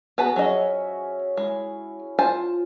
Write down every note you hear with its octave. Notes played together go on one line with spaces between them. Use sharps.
B3 F#4 G#4 B4 G#5 A5
F#3 C#4 C#5 D#5 E5
G#3 E4
F4 C5 G#5 A5